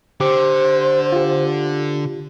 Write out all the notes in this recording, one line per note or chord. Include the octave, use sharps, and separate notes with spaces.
D3 G4 C5 D6
F4 G4